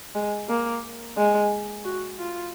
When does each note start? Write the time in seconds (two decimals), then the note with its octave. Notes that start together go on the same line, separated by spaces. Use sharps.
0.15 G#3
0.49 A#3
1.17 G#3
1.85 F#4
2.19 F4